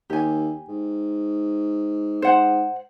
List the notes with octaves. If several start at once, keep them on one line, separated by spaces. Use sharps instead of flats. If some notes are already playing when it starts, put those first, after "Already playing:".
D#2 G4 G#5
G#2
G#2 C5 F#5